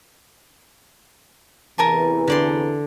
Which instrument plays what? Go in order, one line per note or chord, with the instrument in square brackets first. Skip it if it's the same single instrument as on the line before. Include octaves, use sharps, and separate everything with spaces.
[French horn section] E2 C3 E3 [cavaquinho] A#4 G#5 A5
[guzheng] D3 D5 C6